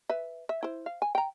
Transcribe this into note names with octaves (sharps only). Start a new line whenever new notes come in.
B4 E5
E5
E4 C5
F5
G#5
G5 A#5